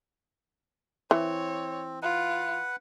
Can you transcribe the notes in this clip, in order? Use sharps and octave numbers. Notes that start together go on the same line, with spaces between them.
E3 C4 C#5
F4 B4 F#5